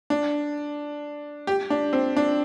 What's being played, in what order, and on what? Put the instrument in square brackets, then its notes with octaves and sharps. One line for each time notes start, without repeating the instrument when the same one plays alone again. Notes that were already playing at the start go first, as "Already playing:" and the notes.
[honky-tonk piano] D4
G4
D4
C4
D4